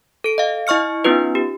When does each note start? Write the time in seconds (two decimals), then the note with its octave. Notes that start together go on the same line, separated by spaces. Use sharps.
0.24 A4 D7
0.38 D#5 F5
0.67 E4 D#5 C#6 F6 C#7
1.04 B3 C#4 D#4 F4 B4
1.35 G4